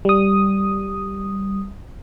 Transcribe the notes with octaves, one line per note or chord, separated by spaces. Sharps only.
G3 D#6